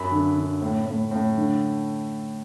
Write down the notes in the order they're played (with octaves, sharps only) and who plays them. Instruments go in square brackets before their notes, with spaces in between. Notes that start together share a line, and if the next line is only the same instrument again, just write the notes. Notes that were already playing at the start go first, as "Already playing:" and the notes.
Already playing: [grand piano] F#2 B5
D3
D3
A2
A2
A2
D3